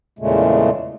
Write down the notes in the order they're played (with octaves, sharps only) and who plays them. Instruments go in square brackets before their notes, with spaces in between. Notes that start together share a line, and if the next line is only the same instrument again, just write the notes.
[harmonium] E2 A#2 C#3 G#3 A3